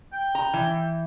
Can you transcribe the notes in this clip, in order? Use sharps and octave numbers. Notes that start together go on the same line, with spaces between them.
G5
A#5
E3